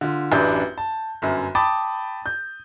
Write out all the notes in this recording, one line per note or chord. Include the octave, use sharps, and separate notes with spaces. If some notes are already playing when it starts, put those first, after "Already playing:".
D3 F4
A1 F#2 D4 G4 B4 G6
A5
G1 F#2
G5 A5 B5 D6 D#6 A6
G6